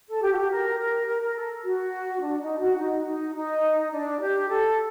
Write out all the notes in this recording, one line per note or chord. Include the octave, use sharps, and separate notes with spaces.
A4
G4
F#4
G4
A#4
A#4
A#4
A#4
A4
F#4
D4
D#4
F#4
D#4
D#4
D#4
D4
G4
A4